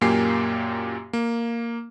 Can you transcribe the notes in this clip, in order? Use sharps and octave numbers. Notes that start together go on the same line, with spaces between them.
F#2 A#2 A#3 G4 G#5 C7
A#3